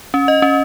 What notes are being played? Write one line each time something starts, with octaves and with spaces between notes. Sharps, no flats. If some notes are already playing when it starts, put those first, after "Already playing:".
C#4
D#5
C#4